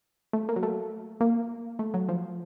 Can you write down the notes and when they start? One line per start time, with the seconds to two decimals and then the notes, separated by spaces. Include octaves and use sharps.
0.33 A3
0.49 A#3
0.56 F#3
0.63 A3
1.21 A#3
1.79 A3
1.94 F#3
2.09 F3